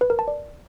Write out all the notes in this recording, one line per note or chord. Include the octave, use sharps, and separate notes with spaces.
B4
A#4
A5
D5